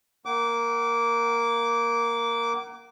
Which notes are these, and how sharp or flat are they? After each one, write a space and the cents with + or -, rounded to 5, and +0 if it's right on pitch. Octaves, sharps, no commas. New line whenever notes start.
A#3 +0 F#5 +35 D6 -15